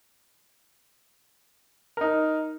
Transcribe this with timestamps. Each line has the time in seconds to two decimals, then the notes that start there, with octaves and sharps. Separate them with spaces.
1.97 D#4 A#4